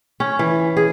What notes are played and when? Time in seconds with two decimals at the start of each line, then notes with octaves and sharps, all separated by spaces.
0.20 C#4
0.39 E3
0.77 G#4